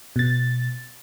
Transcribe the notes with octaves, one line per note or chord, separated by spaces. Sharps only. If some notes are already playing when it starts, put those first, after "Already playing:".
B2 A6